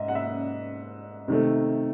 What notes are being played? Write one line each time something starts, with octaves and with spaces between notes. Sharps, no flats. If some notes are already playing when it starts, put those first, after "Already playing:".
Already playing: G#2 D#5 E5
F#5
E5
C3 D#3 A3